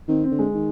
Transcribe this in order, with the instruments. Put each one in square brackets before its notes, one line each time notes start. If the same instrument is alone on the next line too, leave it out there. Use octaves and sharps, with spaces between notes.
[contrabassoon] D#3 [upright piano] C4
[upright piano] C4
[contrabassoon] D3
[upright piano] G#3
[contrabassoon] D#3